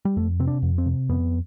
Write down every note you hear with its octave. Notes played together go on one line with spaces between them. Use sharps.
G3
F2 A3
C3 C4
D4
F2
C4
C3
F2 B3